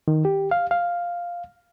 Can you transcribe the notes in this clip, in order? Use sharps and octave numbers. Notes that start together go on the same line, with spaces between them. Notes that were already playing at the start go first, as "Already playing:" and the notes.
D#3
G4
F5
F5